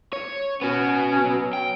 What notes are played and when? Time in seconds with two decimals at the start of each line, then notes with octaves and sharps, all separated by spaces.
0.13 C#5
0.62 B3 C#4 F#4
1.08 C#4
1.24 F#3
1.53 G5